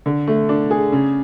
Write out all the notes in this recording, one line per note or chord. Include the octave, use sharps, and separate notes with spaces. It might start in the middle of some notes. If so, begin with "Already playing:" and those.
D3
A3
D4
G#4
C#3